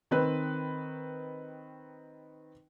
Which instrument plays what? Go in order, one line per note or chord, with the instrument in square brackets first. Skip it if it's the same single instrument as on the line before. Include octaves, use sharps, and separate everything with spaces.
[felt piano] D#3 C4 B4